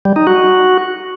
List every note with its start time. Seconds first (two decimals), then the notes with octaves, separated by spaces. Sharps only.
0.05 G3
0.16 D#4
0.27 F#4